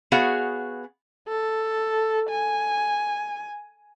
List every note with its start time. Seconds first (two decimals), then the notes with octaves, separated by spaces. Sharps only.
0.12 B3 F#4 G#4 C#5 F5
1.29 A4
2.29 G#5